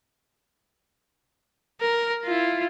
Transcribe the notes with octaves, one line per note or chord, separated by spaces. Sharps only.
A#4
E4 F4